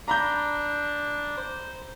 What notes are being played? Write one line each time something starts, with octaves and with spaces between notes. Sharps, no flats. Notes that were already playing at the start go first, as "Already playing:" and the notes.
D4 A#5 B5 G6
C5